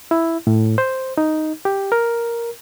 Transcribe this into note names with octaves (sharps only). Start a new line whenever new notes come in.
E4
A2
C5
D#4
G4
A#4